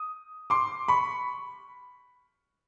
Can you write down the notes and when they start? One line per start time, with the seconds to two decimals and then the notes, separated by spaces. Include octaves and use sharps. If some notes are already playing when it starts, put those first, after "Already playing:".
Already playing: D#6
0.50 C6 D6
0.88 B5 C#6